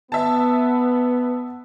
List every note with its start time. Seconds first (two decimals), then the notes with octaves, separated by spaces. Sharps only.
0.12 B3 E5 A5